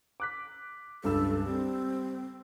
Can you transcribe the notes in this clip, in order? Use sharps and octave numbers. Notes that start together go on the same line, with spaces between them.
D6 F#6 B6
C#2 G2 A4 E6
G3 C4